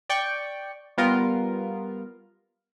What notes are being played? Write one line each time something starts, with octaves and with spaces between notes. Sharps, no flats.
D5 G5 C#6
G3 B3 F4 A#4